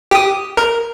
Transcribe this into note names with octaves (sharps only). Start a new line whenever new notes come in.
G4 D#6
A#4